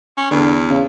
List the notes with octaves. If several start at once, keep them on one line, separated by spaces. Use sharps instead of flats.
C#4
E2 D3
C#3